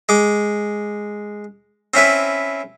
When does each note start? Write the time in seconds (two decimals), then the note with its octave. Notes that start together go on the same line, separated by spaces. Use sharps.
0.09 G#3 D6
1.94 C4 C#4 E4 B4